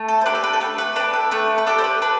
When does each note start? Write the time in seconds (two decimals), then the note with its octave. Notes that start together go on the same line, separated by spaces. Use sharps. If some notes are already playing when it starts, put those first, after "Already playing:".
Already playing: A3
0.08 A4
0.21 C5
0.26 D4 G4 B4
0.35 A4
0.44 B4
0.53 A4
0.60 A3 B4
0.78 B4
0.96 D4 G4 B4
1.13 A4
1.31 A3 B4
1.58 B4
1.66 D4 G4 A4
1.78 C5
1.84 B4
2.02 D4 B4